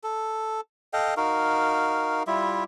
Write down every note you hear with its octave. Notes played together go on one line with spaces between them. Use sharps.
A4
A4 D#5 F5 G5
D#4 F#4 A#4 F5
G3 E4 F4 E5